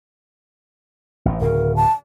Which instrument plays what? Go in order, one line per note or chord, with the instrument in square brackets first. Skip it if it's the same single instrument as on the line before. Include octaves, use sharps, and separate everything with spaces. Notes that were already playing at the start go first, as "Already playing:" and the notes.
[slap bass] A1 A2
[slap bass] D1 C#3 [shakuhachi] A#4
[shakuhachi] A5